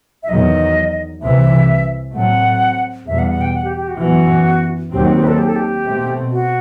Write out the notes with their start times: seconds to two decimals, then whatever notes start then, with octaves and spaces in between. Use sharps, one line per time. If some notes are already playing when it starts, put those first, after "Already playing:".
0.23 E5
0.29 E2 D#3 F#3 D#5
1.21 C2 C3 E3 E5
2.14 A2 F#3 A3 C4 F#5
3.06 E2 B2 G3 E5
3.19 F#5
3.30 F#5
3.41 G5
3.54 F#5
3.65 G4
3.77 G4
3.88 F#4
3.99 F#2 E3 B3 F#4
4.93 D#2 D#3 F#3 C4 G4
5.04 F#4
5.16 G4
5.22 B4
5.28 A4
5.38 G4
5.47 A4
5.56 G4
5.85 B2 A3 C4
6.32 F#4